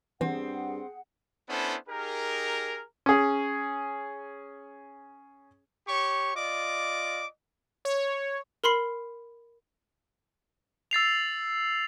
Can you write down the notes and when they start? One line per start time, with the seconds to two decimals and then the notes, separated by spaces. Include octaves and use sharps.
0.21 G2 E3 C4 G#4 F#5
1.49 B3 C#4 D4 E4 A4 C5
1.89 D#4 G4 G#4 A#4
3.06 C#4 G#4
5.87 G4 C#5 C#6
6.35 F4 D5 D#5 D6
7.85 C#5
8.64 A#4 B5 C6 C7
10.91 E6 A6 C7 F7